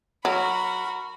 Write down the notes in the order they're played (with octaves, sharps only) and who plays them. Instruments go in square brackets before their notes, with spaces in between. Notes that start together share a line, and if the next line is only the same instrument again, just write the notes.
[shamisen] F#3 [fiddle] F#4 B5 [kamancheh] A#4